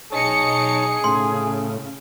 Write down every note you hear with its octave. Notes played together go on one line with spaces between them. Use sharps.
B1 D#4 G#4 C#5 A5 C#7
A2 C#3 C6